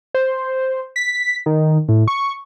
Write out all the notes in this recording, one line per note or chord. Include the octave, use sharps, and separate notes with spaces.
C5
B6
D#3
A2
C#6